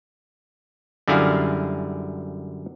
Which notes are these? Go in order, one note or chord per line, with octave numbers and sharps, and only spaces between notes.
F#2 D3 G3 E4 G#4 F5